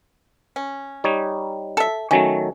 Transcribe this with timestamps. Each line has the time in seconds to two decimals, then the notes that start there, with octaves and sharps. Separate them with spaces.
0.56 C#4
1.04 G3 D#4 C#5
1.77 A4 E5
2.11 D#3 F#3 A3 C#4